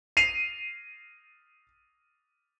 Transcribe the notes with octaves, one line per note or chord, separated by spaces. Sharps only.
C7 D#7 F7